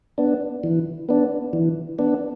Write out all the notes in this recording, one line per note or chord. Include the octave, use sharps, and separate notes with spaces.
B3 D4
E3
B3 D4
E3
B3 D4